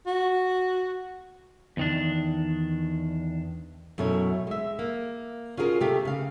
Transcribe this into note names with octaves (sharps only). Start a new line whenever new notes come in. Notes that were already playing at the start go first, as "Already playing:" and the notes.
F#4
E2 D#3 D4
F#2 B2 A3 E4 C#5
G#3 E5
A#3
C#4 F4 F#4 G#4 A#4
C3 A3 G4 F5
C#3 F5